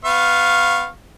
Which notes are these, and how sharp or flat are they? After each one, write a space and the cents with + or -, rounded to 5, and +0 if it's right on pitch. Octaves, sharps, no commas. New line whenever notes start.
B3 +20 F5 +0 C#6 -25